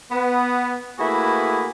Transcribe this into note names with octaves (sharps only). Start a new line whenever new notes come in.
B3
A3 A#3 E4 F#4 G#4 B4